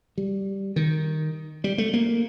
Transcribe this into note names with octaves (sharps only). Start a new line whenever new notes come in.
G3
D#3
G3
A3
A#3